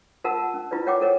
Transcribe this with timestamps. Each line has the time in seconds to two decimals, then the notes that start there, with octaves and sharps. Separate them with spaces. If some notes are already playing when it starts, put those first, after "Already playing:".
0.24 F4 A#4 F#5 A5 E6
0.54 C#4
0.71 E4 F4 B4 D5
0.86 A#4 C#5 F#5 G5 D6
1.01 A4 A#4 C#5